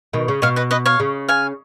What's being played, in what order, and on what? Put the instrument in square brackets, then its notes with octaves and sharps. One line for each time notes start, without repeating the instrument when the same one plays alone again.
[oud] B2 D#3
C#3
[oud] B2 [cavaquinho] C#5 F5
[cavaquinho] B4 D#5
B4 D#5
C#5 F5
[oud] C#3
[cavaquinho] F5 G#5